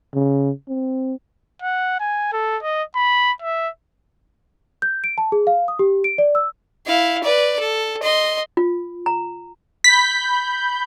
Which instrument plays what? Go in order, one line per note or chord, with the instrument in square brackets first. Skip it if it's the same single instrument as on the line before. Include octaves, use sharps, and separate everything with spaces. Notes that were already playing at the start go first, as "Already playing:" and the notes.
[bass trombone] C#3
C4
[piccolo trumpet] F#5
G#5
A4
D#5
B5
E5
[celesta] G6
D7
A5
G#4
F5
D#6
G4
D7
D5
E6
[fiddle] E4 F5
B4 D5
A4
D#5 C6
[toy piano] F4
A#5
[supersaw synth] B5 G6 [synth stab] B6